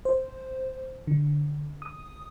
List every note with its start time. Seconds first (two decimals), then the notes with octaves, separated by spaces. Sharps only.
0.05 C5
1.07 D3
1.82 D#6